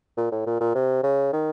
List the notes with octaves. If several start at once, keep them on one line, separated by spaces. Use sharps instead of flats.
A#2
A2
A#2
A#2
C3
C#3
D#3